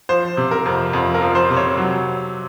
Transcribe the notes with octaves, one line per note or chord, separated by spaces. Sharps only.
F3 C5
C3
A#4
F2
F2
A#4
F3
C5
C3
C#5
F#3